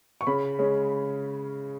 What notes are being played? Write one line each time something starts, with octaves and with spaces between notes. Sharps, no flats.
C#6
C#3 B5
G#3 C#4